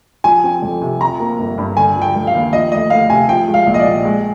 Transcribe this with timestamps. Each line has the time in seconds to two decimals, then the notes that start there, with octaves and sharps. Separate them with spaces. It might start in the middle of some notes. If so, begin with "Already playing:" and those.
0.24 F3 G#5
0.43 C4
0.62 F2
0.82 C3
1.01 F3 A#5
1.20 A#3
1.39 G1
1.58 G2
1.77 D3 G#5
1.95 F3
2.02 G5
2.15 F1
2.27 F5
2.34 D#2
2.52 F3 D#5
2.72 D2 D#5
2.90 D2 F5
3.09 C3 G#5
3.29 F3 G5
3.48 G#3
3.54 F5
3.67 A#1
3.74 D#5
3.80 D5
3.86 A#2
4.05 G#3